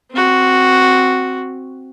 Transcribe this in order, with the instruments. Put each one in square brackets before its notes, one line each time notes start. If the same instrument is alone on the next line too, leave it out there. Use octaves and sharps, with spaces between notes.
[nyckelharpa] C4 F#4